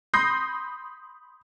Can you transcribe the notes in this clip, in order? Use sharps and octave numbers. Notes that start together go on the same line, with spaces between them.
B5 C6 D#6 G6 A#6 C7